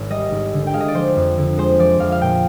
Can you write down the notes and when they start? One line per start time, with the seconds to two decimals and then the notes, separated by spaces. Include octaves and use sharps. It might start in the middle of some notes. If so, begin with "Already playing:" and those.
Already playing: G#1
0.10 G3 D#5
0.31 G#1
0.53 D3
0.67 G5
0.74 G#3 F5
0.80 D#5
0.88 D5
0.94 F3 C5
1.16 F2
1.38 D3
1.58 G#3 C5
1.79 F3 D5
2.00 F2 F5
2.12 F5
2.21 A#2 G5